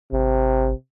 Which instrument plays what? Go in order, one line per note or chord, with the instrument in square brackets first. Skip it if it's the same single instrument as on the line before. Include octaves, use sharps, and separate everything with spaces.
[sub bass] G#1 [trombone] C3